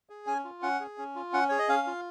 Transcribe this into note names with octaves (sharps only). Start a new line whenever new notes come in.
G#4
C#4 G#5
F4
C#4 F#5
G#4
C#4
F4
C#4 F#5
G#4 C#5
D#5
C#4 F5
F4